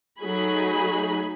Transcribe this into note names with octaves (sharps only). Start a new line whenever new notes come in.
F#3 A3 D#4 G#4 G#5 B5